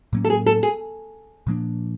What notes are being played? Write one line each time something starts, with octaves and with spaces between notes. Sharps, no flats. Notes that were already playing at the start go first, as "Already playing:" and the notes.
A2 F#3 A#3 C#4
A4
G#4
A4
G#4
A#2 F3 A#3 D4